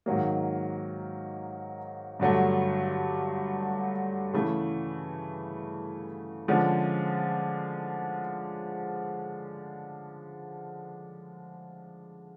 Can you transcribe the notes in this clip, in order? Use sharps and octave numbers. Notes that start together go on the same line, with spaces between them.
G#2 D#3 F#3 A#3
G2 D3 F#3 A3
C#3 E3 A3
D3 F3 G#3 C#4